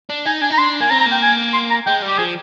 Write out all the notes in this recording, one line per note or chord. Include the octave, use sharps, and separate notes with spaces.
D4
D#4 G#5
D4 G#5
D#4 A#5
D4 C6
A#3 G#5
C4 A#5
A#5
A#3
G5
G#5
C6
A#5
G#3 G5
G3
G4
F3 G#4